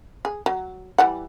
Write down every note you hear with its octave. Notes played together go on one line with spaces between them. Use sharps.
G#4
F#3
E3 G3 F#5